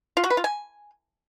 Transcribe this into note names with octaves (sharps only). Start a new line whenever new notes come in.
F4
F#4
B4
F4
G#5